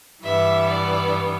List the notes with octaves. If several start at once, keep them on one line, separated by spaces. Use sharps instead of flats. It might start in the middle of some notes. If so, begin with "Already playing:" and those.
G2 E3 G3 B3 E5
D5